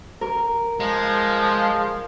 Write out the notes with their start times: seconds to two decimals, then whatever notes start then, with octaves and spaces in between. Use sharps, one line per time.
0.21 A#4
0.80 F3 G#3